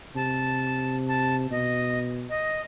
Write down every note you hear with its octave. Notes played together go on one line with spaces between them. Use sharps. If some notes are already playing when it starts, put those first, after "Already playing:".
C3 A5
A5
B2 D#5
D#5